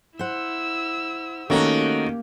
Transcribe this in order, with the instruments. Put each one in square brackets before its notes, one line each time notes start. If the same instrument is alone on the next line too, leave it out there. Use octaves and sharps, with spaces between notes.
[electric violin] E4 E6 [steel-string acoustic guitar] C5 F#5
[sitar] D#3 F#4 [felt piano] A3 C#4 D#4 [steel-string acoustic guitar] A#3 [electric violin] G4